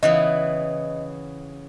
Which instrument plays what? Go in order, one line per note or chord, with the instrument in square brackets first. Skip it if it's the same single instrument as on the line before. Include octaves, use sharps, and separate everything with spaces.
[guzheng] C#3 E3 B3 [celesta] D#5